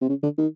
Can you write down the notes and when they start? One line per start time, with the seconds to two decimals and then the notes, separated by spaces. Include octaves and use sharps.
0.01 C3
0.09 C#3
0.23 D3
0.38 D#3